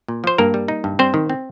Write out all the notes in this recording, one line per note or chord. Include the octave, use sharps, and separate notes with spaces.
A#2
F3 C5
G2 A#3 A#4
G3
D#4
G2
G3 C4 C5
D#3
C4